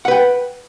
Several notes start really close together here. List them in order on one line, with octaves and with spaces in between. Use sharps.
F#5 B4 G5